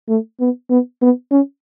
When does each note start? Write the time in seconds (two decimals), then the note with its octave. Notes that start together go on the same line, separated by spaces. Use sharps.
0.09 A3
0.40 B3
0.70 B3
1.02 B3
1.31 C#4